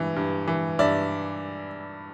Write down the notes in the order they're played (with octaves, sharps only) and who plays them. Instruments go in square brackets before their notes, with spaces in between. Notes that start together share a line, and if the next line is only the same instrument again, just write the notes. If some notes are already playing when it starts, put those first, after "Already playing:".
Already playing: [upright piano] G2 E3
G2
E3
G2 D5 E5